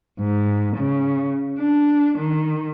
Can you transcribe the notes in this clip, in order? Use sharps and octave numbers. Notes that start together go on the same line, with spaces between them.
G#2
C#3
D4
D#3